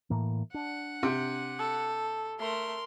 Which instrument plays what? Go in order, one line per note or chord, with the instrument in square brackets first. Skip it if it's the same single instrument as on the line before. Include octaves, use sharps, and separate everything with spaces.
[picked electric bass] A2 E3 A#3
[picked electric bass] D4 [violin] F#5
[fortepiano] C3
[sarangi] A4
[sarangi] A3 [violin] A#4 C6